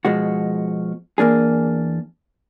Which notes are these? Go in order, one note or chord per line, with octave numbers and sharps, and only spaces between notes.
B2 F3 G#3 F#4
E2 A#3 D4 G#4